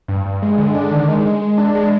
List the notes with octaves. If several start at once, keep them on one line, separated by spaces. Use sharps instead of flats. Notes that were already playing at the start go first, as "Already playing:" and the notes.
G2
G2
G#3
D3
D4
D#3
G#3
G#3
G#3
D4
G#3